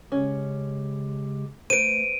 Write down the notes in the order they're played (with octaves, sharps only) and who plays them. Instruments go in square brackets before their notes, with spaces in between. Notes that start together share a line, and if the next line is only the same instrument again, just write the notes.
[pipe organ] C#3 G#3 G4 [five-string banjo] C#4
[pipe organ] A3 [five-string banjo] B4 C5 [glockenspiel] D7 D#7